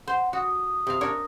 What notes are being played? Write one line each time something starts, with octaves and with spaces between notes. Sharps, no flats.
C5 F#5
F#4 D#6
C3 F5
D4 A#4 C#5